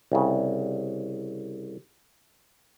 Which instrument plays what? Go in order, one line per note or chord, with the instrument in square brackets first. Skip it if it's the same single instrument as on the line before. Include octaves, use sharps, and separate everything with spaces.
[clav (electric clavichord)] C2 C#3